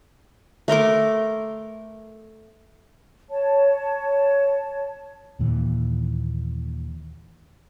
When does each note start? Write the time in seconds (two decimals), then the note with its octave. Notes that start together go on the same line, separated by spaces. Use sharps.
0.68 A3 A#4 C6 D6
3.30 C#5 A5
5.39 D#2 A#2 E3